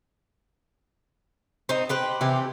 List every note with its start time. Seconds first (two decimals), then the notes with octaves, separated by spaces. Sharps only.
1.69 C4 D#4
1.89 G4 B4 C5
2.21 C3 E3 G4